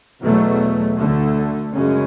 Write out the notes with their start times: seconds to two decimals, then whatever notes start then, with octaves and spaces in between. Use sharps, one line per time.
0.20 E2 B2 F#3 A3
0.96 D2 D3 A3
1.73 F#2 C#3 G#3 C#4